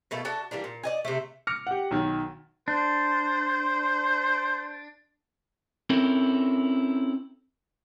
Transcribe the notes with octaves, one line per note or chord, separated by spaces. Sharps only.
B2 A3 A#3 A4
D4 F#4 A4 A5
E3 G3 A#3 D4
A#2
D5 D#5 G#5
C3 A3
D6 F6 A#6 C#7
G4 F#5
B1 D#3
D4 C5
C4 C#4 E4 A4 A#4